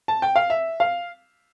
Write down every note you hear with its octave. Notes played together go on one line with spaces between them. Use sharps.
A5
G5
F5
E5
F5